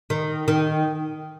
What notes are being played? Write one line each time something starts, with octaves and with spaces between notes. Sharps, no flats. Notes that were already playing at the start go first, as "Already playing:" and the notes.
D#3
D#3